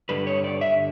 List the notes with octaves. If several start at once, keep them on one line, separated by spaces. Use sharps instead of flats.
G2 D3 G3 B4
C#5
D5
E5